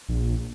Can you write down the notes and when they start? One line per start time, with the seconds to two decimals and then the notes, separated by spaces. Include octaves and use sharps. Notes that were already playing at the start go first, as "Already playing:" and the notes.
0.09 A#1